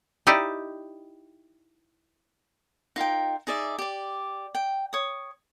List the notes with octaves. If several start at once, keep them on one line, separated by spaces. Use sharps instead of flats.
D#4 E4 G4 D5
D#4 F4 A#4 G5
D#4 G#4 D5 E5
G4 D5
G5
C#5 D#6